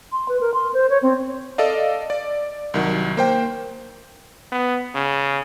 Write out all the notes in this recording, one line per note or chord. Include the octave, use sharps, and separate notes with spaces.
C6
B4
A#4
C6
C5
C#5
C4
A4 D5 D#5 F5
D5
C2 D#3 F#3
A#3 C5 G5
B3
C#3